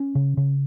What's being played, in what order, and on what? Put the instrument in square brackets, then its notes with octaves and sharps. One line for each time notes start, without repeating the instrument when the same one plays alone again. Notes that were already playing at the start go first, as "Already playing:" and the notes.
Already playing: [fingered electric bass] C#4
C#3
C#3